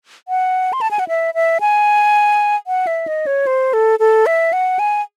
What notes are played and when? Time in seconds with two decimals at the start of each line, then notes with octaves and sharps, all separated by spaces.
0.28 F#5
0.73 C6
0.81 A5
0.91 G#5
0.99 F#5
1.08 E5
1.34 E5
1.61 G#5
2.67 F#5
2.87 E5
3.07 D#5
3.27 C#5
3.47 C5
3.73 A4
3.99 A4
4.26 E5
4.53 F#5
4.79 G#5